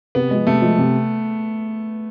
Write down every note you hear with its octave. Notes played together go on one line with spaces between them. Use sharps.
C3 B3
F3 G#3
C3 A3
F3 G#3
C3